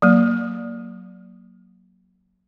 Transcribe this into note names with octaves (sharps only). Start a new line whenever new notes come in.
F#3 A#3